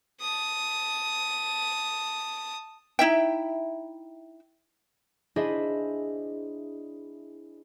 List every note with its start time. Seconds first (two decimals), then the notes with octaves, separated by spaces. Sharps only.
0.21 A5 D#6
2.99 D#4 E4 E5 G5
5.36 D4 E4 G#4 C5 D#5 E5